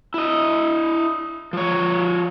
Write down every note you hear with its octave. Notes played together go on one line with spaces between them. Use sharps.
E4 D#5
F3 C#5